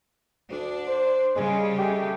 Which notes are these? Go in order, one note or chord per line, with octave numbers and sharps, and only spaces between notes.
D2 D4
C5
C#3 G3 G#3
G#3 A3 G4